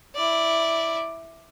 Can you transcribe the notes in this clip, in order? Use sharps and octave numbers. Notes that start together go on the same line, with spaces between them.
E4 D5